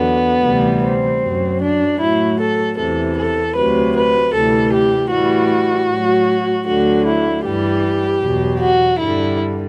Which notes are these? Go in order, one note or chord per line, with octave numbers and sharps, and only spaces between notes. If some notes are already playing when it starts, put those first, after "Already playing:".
Already playing: E2 D3 F#3 B3
D2 C3 E3 G3
C4
F#2 F#3
D4
A2 F#3 E4
A4
E2 C3 E3 A4
A4
D2 C3 F#3 B4
B4
D2 C3 E3 G3 A4
G4
A2 E3 G3 F#4
A2 F#3
D2 D3 F#3 F#4
E4
G2 E3 G3 G4
E2 B2 F#3
F#4
G2 D3 G3 E4